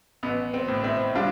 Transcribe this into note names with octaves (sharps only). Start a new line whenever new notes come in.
A1 B3
C4
A2
C4 E4
G3 D4 F4